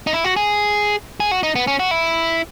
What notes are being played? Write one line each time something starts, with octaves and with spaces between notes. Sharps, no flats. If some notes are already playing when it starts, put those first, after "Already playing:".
D#4
E4
F#4
G#4
G#4
F#4
D#4
B3
C#4
F#4
E4